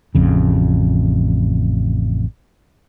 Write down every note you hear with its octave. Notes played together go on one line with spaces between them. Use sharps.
A1 F2 C#3